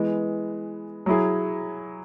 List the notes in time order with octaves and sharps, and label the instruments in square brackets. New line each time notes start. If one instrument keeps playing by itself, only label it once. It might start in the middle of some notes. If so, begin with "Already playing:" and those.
Already playing: [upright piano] E3 G#3 B3
F#3 E4 G#4